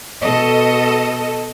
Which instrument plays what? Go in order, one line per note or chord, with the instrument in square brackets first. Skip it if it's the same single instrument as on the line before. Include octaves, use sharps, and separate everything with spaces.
[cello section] B2 A4 D#5